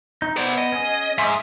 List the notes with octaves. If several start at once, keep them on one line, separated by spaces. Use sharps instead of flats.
D#4
B3 C5 D5
D#5
C#4 G#4
G#2 E5 C6 D#6